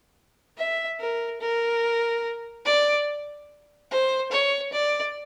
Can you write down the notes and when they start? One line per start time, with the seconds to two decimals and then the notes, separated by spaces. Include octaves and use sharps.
0.58 E5
1.00 A#4
1.41 A#4
2.66 D5
3.91 C5
4.32 C#5
4.73 D5